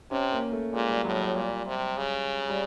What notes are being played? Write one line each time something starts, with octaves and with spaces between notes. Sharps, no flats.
C3 C#4
A#3
A3
A#2 G#3
G3
A2 F#3
F#3
A#2 G3
C3
C#3
G3